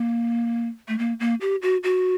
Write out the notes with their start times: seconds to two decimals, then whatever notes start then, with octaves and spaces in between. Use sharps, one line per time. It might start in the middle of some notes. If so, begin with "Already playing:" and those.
Already playing: A#3
0.88 A3
0.99 A#3
1.20 A#3
1.41 G4
1.62 F#4
1.83 F#4